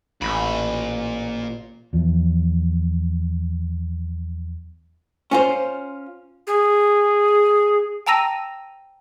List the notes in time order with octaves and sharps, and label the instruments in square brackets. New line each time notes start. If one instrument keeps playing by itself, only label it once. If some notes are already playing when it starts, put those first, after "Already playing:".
[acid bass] A1 [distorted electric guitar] A#2 B5
[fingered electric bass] E2 F3
[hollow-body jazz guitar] C#4 F4 C5
[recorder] G#4
[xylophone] G5 A5 A#5 E6 A#6 D#7